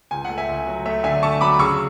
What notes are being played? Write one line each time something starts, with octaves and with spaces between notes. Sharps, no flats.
C#2 G#5
A3 F#5
E5 G#5
C#2
F#3
A3 E5
D3 E5 G#5
A3 A5 C#6
F#3 B5 D6
C#3 C#6 E6